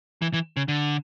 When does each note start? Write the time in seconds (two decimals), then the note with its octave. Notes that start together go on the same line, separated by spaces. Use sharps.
0.22 E3
0.33 E3
0.57 C#3
0.68 D3